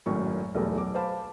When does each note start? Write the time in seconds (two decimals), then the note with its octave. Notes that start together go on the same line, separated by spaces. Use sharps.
0.06 G#1 F#2 A2 D#3 C#6
0.55 B1 E2 G3 A3 A#4
0.75 B1 D6
0.94 B4 C5 F5 A5 B5